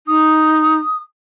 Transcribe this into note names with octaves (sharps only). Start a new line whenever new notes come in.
D#4 D#6